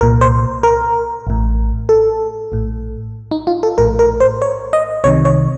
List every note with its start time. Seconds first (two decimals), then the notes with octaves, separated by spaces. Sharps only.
0.01 C2 A#2 A#4
0.21 C5
0.63 A#4
1.27 A1 A2
1.89 A4
2.52 A#1 A2
3.31 D#4
3.47 F4
3.63 A4
3.78 A#1 A2 A#4
3.99 A#4
4.20 C5
4.42 C#5
4.73 D#5
5.04 C2 C3 D#3 C#5
5.25 C#5